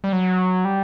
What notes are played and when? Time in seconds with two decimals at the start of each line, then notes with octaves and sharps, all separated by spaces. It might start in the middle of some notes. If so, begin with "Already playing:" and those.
0.04 G3
0.12 F#3
0.65 G3